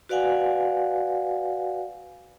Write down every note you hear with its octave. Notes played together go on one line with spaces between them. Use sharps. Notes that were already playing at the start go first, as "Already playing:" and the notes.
F#4 B4 D5 F5 F#5 G#5